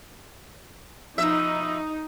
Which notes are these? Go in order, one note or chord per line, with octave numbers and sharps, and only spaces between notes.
B2 F3 D#4 E5